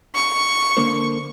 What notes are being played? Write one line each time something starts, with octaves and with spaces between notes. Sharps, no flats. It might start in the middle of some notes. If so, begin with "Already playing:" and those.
C#6
D3 A#3 C5